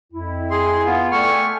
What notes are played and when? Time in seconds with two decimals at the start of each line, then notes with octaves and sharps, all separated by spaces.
0.13 F2 E4
0.51 G#4 C6
0.85 B3 F4
1.12 A3 D5 G5 G#5 C#6 F6